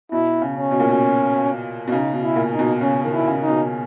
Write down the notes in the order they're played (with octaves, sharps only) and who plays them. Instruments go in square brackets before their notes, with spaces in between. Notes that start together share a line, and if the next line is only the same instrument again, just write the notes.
[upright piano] B2 [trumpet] E4
[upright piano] C#3
[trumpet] C#4
[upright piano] B2
A#2
B2
B2
[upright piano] C#3 [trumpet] D#4
[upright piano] B2
[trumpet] E4
[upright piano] A#2
[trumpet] D#4
[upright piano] B2
[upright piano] C#3 [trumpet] C#4
[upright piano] D#3
[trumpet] E4
[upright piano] C#3
[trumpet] D#4
[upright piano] B2